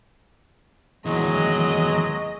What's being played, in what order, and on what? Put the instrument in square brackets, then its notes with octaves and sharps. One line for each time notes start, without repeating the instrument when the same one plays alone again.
[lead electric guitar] D#2 E3 [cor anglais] F#3 [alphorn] G#3 [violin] D#5